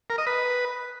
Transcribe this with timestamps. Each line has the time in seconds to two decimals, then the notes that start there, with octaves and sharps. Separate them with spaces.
0.10 A#4
0.18 D#5
0.27 B4